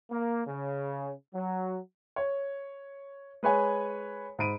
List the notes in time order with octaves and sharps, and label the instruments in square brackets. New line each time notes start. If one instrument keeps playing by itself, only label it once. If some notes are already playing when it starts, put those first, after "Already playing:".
[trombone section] A#3
C#3
F#3
[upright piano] C#5
G#3 B4 C#5 G#5
G#2 B5 D7 D#7